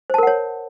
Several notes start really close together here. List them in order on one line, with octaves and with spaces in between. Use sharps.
C5 A5 A#4 F#5 C#5